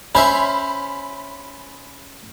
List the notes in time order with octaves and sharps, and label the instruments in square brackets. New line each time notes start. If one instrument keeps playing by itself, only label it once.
[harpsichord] C#4 C5 E5 [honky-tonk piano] B5